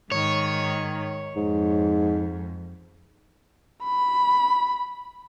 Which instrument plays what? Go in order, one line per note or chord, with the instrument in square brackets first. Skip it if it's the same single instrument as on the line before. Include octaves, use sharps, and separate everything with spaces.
[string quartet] G#2 D#3 [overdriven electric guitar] C#5
[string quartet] F2 [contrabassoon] G#2
[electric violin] B5